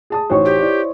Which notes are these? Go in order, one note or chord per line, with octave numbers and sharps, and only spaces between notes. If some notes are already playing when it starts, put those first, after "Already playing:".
G#4 A5 D#6
A1 D#4 F#4 C5 C#5 C#6
G4
E4 D5